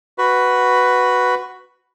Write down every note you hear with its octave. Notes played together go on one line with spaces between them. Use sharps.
F#4 B4